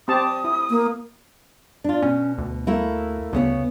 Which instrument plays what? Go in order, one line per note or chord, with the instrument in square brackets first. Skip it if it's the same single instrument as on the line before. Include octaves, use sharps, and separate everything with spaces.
[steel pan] C4 G4 A5 [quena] D#6
[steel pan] E4
[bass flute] A#3
[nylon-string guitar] D4 F4
[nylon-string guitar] B2 [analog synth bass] C#4
[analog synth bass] D2
[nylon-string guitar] A3 A#3 E4
[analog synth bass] D2 [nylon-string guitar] C#3 B3 C#5